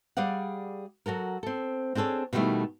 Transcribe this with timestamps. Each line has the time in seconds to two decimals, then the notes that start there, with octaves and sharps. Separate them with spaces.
0.17 G3 G#4 D5 F5 F#5
1.06 F#3 F#4 A4 A#4
1.43 C4 A4
1.95 C4 D4 G#4 A4 C#5
2.33 B2 D3 D#3 G3 A3 E4